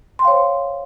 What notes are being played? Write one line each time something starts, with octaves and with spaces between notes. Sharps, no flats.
C5 C#5 F5 G5 C6